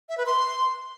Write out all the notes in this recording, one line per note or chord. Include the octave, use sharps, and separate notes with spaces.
E5
B4
C6